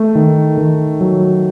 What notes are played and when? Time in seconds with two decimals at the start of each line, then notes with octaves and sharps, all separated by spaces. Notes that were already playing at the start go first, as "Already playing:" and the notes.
Already playing: A3
0.15 D#3
0.58 D#3
1.01 F#3